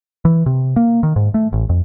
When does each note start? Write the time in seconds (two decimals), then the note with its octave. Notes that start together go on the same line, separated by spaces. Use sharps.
0.25 E3
0.46 C3
0.76 A#3
1.03 D#3
1.16 G#2
1.34 A3
1.53 A1
1.69 F2